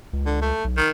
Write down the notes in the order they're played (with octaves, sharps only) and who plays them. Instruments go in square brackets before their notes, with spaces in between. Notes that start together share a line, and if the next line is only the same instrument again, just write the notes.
[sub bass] C#2
[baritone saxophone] D3
A3
[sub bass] B1
[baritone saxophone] D#3